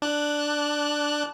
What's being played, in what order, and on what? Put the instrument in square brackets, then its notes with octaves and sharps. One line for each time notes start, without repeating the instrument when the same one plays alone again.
[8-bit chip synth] D4 F#6